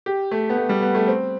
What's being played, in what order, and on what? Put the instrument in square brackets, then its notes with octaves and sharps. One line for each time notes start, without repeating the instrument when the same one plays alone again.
[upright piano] G4
A3
B3
A3
G3
B3
A3
C4